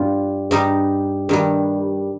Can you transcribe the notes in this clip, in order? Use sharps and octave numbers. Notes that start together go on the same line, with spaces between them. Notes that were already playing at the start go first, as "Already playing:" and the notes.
Already playing: G2 G3 F4
G2 G3 D#4
G2 D#3 G3